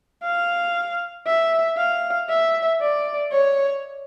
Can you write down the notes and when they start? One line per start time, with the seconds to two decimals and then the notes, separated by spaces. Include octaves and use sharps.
0.24 F5
1.27 E5
1.78 F5
2.30 E5
2.81 D5
3.32 C#5